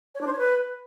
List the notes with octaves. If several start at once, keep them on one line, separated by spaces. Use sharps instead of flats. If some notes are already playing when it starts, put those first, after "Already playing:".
C#5
D4
C5
C#5
B4